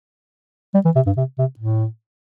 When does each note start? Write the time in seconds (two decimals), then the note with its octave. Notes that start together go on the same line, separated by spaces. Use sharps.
0.74 G3
0.85 E3
0.96 C3
1.06 G2
1.17 C3
1.39 C3
1.59 A2